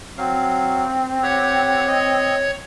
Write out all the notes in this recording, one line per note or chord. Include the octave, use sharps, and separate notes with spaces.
F#3 C4 F5
G4 C#5 F#5
D#5